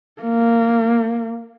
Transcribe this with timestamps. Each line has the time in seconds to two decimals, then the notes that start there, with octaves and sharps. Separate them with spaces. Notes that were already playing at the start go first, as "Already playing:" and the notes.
0.22 A#3